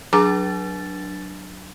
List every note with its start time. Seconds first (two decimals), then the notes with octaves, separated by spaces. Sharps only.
0.13 F#3 D4 G#4 A#5 D6 A6